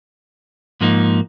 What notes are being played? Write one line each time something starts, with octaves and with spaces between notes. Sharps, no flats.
G#2 F3 A#3 D#4